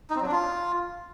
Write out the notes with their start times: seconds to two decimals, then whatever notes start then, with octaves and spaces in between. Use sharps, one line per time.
0.10 D#4
0.16 C4
0.21 F#3
0.26 D4
0.32 F4